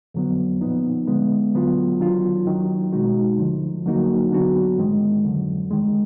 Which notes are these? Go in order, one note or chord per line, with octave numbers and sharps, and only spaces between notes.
F2 D3 F#3 B3
A#2 F3 B3 D#4
D3 G#3 B3
D2 D3 F#3 B3 F4
D#3 F#3 D4 F4
D#2 D#3 F#3
B2 G#3 D#4 F#4
D2 D3 F3
D3 F#3 A#3 D#4 F#4
D3 F#3 B3 D4 F#4
G#2 D#3 G#3
F2 D3 F#3
D#2 D#3 G#3